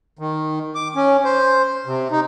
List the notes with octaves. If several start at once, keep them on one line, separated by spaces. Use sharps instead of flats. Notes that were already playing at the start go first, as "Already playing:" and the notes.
D#3
D6
C#4
C5
C3
D#4